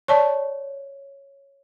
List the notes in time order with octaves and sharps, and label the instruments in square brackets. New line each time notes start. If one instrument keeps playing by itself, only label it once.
[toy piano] C#5 [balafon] D5 A5 C#6